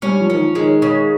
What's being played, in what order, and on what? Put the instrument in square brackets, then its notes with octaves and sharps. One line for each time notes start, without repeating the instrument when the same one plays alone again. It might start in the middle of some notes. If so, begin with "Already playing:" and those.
[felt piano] G3 [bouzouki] C#4
[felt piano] F3
[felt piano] D#3 [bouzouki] C#4
[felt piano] F3
[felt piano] D#3 [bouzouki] G#3
[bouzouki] C#3